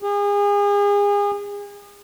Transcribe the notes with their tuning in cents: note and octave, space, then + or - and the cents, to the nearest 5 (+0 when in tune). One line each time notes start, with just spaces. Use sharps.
G#4 -35